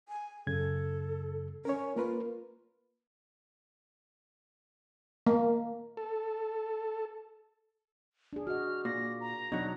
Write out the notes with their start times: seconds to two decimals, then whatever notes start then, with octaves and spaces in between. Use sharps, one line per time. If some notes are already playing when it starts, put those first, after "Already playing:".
0.09 G#5
0.47 F#2 C#3 A4 G#6
1.65 C#4 A#4 C#5
1.96 A#3 F4 A#4 B4
5.27 A#3
5.97 A4
8.33 D4 G#4
8.47 F#4 D#5 F6
8.85 A#2 A#6
9.21 A#5
9.52 B2 F#3 D4 D#4 D#5